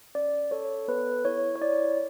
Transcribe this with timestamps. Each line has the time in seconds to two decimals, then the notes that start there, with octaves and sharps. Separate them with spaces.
0.15 C#4 D5
0.51 A4 C#5
0.88 B3 B4
1.25 E4 C#5
1.56 C#5
1.61 E4 D5